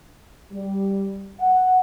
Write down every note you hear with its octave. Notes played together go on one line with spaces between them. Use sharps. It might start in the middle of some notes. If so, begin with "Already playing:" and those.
G3
F#5